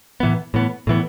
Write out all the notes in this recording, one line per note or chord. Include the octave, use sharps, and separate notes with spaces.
A2 E3 B3
A2 E3 B3
A2 E3 B3